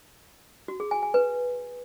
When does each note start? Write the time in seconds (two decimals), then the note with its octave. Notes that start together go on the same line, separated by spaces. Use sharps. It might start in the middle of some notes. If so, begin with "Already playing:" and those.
0.68 F#4
0.80 G#4
0.91 G#5
1.03 G#5
1.14 B4